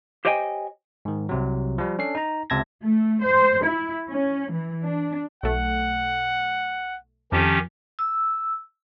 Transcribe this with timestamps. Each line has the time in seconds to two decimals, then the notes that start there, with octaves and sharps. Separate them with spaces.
0.25 G4 C5 C#5 D#5 G5 G#5
1.05 G#2 D#3
1.29 C2 C3 F#3
1.78 F3 G3
1.99 C#4 D4 A4 C7
2.15 D#4 A#5
2.50 C#2 C3 E5 A5 G#6 A#6
2.81 A3
3.20 C5
3.63 E4
4.07 C#4
4.50 E3
4.84 D4
5.43 B1 A3 F#5
7.32 F2 D#3 C#4 G4 A5
7.99 E6